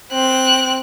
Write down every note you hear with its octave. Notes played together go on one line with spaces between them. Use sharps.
C4 F#6